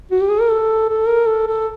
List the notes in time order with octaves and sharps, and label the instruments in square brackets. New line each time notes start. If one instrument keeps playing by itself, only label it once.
[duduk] F#4
G4
G#4
A#4
A4
A4
A#4
A4
A4